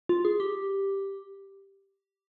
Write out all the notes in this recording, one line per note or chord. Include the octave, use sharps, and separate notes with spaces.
F4
G#4
G4